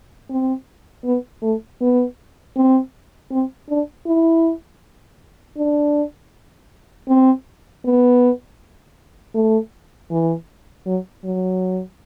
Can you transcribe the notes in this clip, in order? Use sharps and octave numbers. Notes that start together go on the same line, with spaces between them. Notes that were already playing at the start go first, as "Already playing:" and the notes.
C4
B3
A3
B3
C4
C4
D4
E4
D4
C4
B3
A3
E3
F#3
F#3